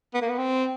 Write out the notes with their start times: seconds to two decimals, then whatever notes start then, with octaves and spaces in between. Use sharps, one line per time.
0.14 B3
0.21 A#3
0.29 B3
0.38 C4